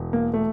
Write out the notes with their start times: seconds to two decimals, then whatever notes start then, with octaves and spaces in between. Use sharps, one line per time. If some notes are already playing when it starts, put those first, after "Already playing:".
Already playing: E1
0.13 A#3
0.34 A3